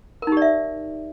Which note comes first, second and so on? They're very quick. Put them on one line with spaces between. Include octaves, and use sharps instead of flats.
A#4 D#4 G4 D5 E5